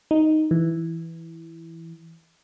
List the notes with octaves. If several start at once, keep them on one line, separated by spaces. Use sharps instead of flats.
D#4
E3